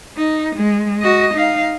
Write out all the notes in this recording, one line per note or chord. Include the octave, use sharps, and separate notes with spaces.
D#4
G#3
F#4 D#5
D#4 F5